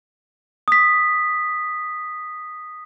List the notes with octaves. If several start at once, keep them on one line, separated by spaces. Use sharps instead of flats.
D#6 B6